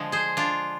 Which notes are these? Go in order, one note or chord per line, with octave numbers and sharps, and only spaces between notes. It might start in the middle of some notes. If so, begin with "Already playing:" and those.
Already playing: D3 F3 G#3
G#4 C5
D4 F4